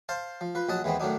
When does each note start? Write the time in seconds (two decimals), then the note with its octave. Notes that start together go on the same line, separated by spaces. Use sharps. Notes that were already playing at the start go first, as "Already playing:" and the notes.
0.09 C5 F5 A5
0.41 F3
0.55 F3 B4
0.69 A#1 F#3 D#5 F#5 A5
0.84 D#2 E3 G#3 B3 C4
1.00 A2 D#3 F#3 D4 D#4